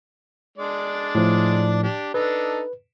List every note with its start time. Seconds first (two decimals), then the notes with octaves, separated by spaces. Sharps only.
0.58 G#3 D4 D5
1.15 A2 F3
1.83 D4 G4
2.14 D4 D#4 A4 B4